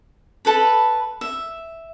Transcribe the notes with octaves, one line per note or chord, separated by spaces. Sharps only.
A4 B4 B5
E5